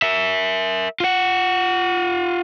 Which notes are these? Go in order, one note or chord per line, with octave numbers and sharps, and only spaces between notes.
A#4 E5
F4 F#5